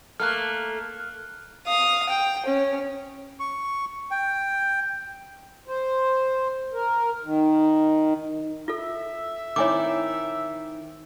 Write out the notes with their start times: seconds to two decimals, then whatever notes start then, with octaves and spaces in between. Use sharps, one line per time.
0.20 A3 A#3 F6 F#6
1.67 F5 D#6
2.09 G5
2.46 C#4
3.40 C#6
4.11 G5
5.67 C5
6.73 A#4
7.24 D#3
8.68 F4 A4 E5
9.56 D#3 C4 E4 C#5 G#5 D6